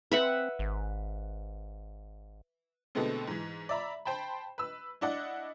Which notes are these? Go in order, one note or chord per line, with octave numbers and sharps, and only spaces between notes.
C4 B4 E5 F#5
G#1
B2 D3 G#3 A3 B3 C4
G#2 E3
D5 E5 A#5 B5
C5 G5 A5 B5
B4 E6
D4 E4 D5 D#5 F#5